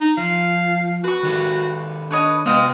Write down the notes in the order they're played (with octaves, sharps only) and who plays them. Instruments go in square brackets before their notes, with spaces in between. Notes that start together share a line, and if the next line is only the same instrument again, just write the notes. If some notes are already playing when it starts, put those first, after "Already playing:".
[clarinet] D#4
[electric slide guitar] F3 [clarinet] F5
[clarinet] F#4 [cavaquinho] B4 C#6
[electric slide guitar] D#3 G4 A4
[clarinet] D4 [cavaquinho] B4 C#5 D#5
[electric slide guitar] C3 B3 [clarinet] G#3 [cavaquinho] D#5 F5 G5